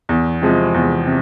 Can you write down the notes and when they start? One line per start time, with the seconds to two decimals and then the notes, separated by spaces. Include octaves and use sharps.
0.09 E2
0.42 C3 F3 G#3
0.74 E2
1.06 C3